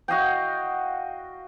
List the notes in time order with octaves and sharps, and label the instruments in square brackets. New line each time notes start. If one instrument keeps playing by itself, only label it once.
[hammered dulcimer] F#4 D#5 F5 G5